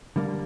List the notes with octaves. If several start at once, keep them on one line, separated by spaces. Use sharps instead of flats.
D3 G3 A#3